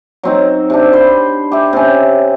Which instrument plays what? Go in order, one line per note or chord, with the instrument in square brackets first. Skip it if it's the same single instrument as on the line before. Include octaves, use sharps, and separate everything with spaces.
[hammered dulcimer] F#3 C4 D#4
C3 D4
C5 B5 C6
G4 E5
C3 C#4